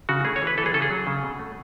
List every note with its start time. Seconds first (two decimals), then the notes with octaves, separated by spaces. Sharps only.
0.09 C#3 F#4
0.25 A3 G#4
0.36 C#5
0.42 E3
0.47 B4
0.58 E3 A4
0.66 G#4
0.74 C#3 A4
0.82 G#4
0.90 F#3
1.07 C#3
1.23 B2
1.39 A3